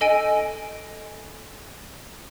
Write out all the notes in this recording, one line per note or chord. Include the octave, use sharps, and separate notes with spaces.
A4 D#5 G#5 D7 D#7